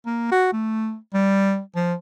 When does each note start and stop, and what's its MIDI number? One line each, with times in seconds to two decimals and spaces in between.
0.06 0.29 58
0.32 0.49 66
0.52 0.96 57
1.14 1.60 55
1.76 1.94 53